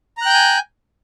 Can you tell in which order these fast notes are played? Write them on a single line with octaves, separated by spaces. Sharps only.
A#5 F#6 G5 G6 G#5